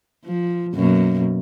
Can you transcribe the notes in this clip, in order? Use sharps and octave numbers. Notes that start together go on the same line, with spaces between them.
F3
F#2 B2 A#3